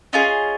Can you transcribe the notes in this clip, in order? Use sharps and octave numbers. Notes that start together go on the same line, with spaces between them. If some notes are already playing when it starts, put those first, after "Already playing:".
C#4 F4 G#4 D#5